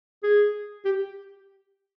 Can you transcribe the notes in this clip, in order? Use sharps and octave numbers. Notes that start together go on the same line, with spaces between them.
G#4
G4